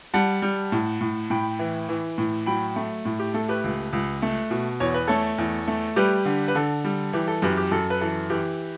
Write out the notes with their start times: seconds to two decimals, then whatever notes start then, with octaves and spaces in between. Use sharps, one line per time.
0.14 G3 F#5 A5
0.42 G3
0.72 A2
1.01 A2
1.30 A2 G5 B5
1.59 E3
1.89 E3
2.18 A2
2.46 F#3 G5 B5
2.76 A3
3.05 A2
3.20 G4
3.34 A3 A4
3.49 G4 B4
3.64 C#2
3.93 C#2
4.22 A3
4.50 B2
4.80 E2 C#5
4.94 B4
5.07 A3 A4 C#5
5.38 E2
5.68 A3
5.96 G3 G4 B4
6.25 D3
6.48 B4
6.55 D3 A4
6.84 G3
7.13 E3 G4
7.28 A4
7.42 F#2 G4 B4
7.57 G4
7.71 F#2 A4
7.90 B4
8.01 E3 A4
8.30 E3 G4